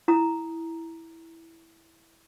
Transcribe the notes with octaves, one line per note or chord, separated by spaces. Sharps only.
E4 A#5 D#6